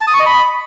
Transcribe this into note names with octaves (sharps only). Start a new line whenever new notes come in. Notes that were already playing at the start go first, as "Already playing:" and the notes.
A5
D#6
C#6
D#5
B5